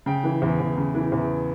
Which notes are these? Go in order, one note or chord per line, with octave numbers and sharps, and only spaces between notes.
C#3 G5
E3
E2
E2
C#3
E3
E2